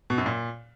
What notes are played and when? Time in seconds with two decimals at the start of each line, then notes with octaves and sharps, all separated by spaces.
0.10 B2
0.18 F#2
0.26 A#2